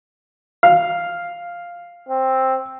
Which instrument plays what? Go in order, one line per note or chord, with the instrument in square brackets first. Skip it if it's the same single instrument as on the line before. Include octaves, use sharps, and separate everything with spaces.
[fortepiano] F5
[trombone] C4